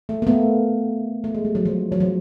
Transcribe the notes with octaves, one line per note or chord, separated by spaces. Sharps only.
A3
A#3
A3 B3
A3
G#3
G3
F#3
F3
F#3
F3